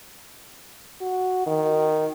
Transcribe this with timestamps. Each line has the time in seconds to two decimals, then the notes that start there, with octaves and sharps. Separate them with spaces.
1.01 F#4
1.47 D#3